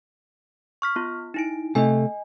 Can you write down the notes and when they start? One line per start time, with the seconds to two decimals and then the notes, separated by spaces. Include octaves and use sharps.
0.82 C#6 F6 B6
0.96 B3 F4
1.34 D#4 E4 D7
1.75 C3 A3 D#5 G#5